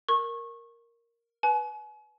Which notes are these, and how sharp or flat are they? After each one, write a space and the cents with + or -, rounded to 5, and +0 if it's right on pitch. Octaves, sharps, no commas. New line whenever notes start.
A#4 +0 C#6 -25
B4 +0 G#5 +40